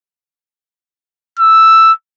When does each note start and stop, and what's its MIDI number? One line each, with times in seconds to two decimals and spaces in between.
1.39 1.92 88